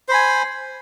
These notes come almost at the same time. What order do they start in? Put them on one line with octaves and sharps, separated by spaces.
C5 B5 G#5